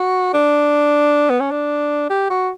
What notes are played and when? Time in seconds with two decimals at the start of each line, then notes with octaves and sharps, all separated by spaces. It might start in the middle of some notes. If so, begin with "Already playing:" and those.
Already playing: F#4
0.34 D4
1.30 B3
1.40 C#4
1.51 D4
2.10 G4
2.30 F#4